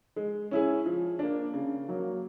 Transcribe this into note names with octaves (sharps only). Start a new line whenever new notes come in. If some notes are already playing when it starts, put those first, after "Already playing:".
G#3
C#4 E4 G#4
F3
A#3 D4
C#3
F#3 A#3